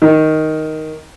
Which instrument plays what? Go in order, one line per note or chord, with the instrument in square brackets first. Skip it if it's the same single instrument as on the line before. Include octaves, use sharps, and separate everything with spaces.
[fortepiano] D#3